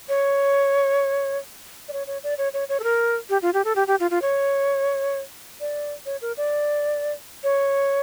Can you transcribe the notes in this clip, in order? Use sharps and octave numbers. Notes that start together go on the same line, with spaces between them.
C#5
D5
C#5
C#5
D5
C#5
C#5
C#5
A4
A#4
G4
F4
G4
A4
G4
G4
F4
F4
C#5
D5
C#5
A#4
D5
C#5